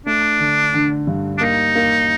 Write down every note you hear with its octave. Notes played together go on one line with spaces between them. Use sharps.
A3 D4
D3
D3
G2
D4
A#3 D#4
A#3